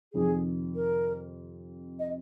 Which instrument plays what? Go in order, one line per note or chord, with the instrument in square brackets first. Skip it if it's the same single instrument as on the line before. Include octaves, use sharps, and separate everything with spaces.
[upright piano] F2 C3 D#3 [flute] G#4
[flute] A#4
D#5